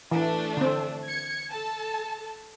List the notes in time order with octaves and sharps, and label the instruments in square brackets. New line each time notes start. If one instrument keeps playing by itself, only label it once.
[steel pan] E3 [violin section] A3 D4
[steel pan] D3 C4
[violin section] G#6 C#7
A4 A5